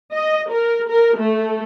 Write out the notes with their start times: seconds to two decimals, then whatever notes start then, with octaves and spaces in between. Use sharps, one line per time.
0.13 D#5
0.51 A#4
0.89 A#4
1.17 A3